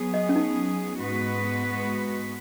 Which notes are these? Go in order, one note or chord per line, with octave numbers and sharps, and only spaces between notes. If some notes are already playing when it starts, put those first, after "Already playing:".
Already playing: F#3 B3 G#4
D#5
C#4
D#4
G#2 G#3 B3 F#4 B4